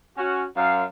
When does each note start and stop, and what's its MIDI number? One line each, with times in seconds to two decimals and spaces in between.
0.17 0.43 61
0.17 0.43 66
0.56 0.83 42
0.56 0.83 77